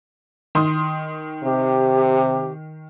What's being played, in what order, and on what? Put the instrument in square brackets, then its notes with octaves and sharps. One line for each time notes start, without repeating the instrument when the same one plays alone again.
[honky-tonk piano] D#3 C6 D#6
[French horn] C3 [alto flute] G4